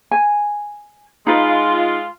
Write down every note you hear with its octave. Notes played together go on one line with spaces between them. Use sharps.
G#5
G#3 D#4 F4 B4